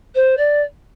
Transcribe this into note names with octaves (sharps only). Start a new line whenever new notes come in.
C5
D5